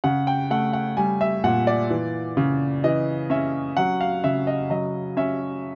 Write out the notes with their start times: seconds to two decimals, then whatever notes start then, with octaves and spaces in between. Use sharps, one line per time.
0.04 C#3 F#5
0.27 G5
0.51 A3 F#5
0.73 F#5
0.97 G3 G#5
1.21 E5
1.44 A#2 F#5
1.67 D5
1.90 E3
2.37 C#3
2.84 E3 D#5
3.30 C#4 E5
3.77 F#3 F#5
4.01 F5
4.24 C#3 E5
4.47 D#5
4.70 F#3 D#5
5.17 C#4 E5